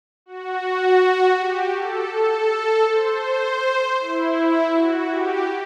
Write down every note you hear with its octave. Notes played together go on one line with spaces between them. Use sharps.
F#4
G4
A4
A4
C5
E4
F#4
G4